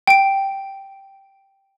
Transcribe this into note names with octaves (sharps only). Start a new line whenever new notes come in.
G5 D7